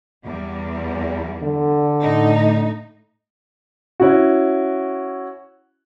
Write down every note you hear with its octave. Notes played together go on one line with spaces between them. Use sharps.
E2 G3
D3
A2 D#4
C#4 E4 F#4